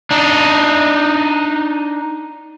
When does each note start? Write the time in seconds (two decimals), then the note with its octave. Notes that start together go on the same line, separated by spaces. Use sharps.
0.11 D4 D#4